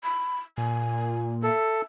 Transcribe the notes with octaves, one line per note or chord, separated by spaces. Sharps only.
B5
A#2 G#5
A4 E5